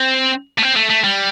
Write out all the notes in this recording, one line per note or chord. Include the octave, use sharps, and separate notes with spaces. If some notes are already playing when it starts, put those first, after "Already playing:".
Already playing: C4
A3
C4
A3
A3
G3